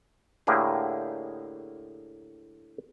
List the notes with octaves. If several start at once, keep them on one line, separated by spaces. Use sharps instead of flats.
A2 D3 A#3 G4 G#4